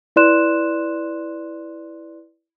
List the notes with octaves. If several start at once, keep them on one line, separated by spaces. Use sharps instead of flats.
E4 B4 D5 C6 F#6 E7